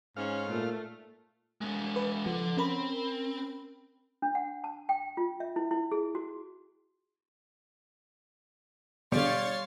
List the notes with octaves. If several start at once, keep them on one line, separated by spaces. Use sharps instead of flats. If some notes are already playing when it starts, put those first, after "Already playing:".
G#2 C#4 F5
A#2 A3
G#3 B3
B4
F3 A4 F#5
C4 C#4 A#4 B5
D4
F#5
A5
G5
F4
E5
E4
E4
G#4
F#4
B2 D3 G3 C#5 F5 C6 C#6 A6